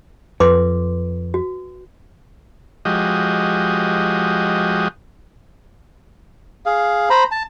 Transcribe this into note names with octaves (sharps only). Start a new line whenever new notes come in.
F2 B4 C6 D6
F#4
F3 G#3 F#4 G4 D#5
G#4 F5
C5 A#5 B5
A5